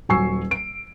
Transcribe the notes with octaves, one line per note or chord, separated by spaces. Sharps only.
D#1 F#3 G#5 C#6 E6 C7
D7